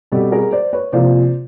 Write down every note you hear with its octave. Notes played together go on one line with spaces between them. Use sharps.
B2 G3 C4 G4 A4
G#4 A#4
C5 D5
B4 C#5
C3 F3 A#3 C5 D5